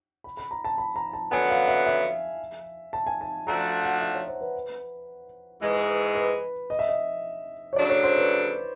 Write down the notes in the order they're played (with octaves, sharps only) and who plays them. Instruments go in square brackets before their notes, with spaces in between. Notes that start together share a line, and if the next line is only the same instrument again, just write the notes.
[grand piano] B5
B5
A#5
A5
B5
A#5
A5
[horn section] F#2 D3 F#3 B3 [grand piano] G#5
[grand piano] F5
E5
E5
A5
G#5
A5
[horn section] F3 A3 D4 F#4 [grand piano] A#5
[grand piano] F#5
E5
C#5
C5
B4
[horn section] G#2 E3 G#3 [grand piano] B4
[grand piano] B4
D#5
E5
D#5
C#5
[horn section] C#3 F#3 A3 D4 [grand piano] D5
[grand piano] C#5
C5
B4